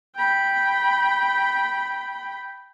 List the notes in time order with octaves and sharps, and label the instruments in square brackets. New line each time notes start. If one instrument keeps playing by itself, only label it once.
[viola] G5 B5